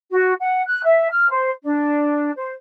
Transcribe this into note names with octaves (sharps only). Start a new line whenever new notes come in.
F#4
F#5
F#6
E5
F6
C5
D4
C5